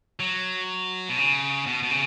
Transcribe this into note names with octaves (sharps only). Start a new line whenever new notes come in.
F#3
B2
C#3
B2
B2
C#3